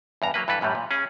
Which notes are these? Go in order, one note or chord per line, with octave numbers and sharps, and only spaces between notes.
E2 G2 A#5
F#3 A#3 B4
G2 E3 A4 B4
F#2 A2 E3 G3
A#2
C#4 G#4